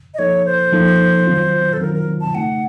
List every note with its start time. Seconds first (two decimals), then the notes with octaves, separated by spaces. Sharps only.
0.14 D#5
0.19 F3 A#3 D#4 A4 C#5
0.46 C5
0.73 F3 A#3 D#4 A4
1.27 D#3 F#3 C4 F4
1.73 A4
1.81 D#3 F#3 C4 F4 A#4
1.94 A#4
2.21 A5
2.35 C#3 A3 D#4 F#5